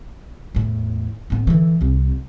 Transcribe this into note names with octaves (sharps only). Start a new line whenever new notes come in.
E2 A2
A2 B3
D3 E3
C2 C3